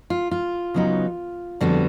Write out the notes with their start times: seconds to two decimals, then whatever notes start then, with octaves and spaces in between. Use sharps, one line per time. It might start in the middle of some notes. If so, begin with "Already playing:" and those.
0.10 F4
0.31 F4
0.74 C#3 F#3 B3 D#4
1.61 F2 D3 G3 B3 F#4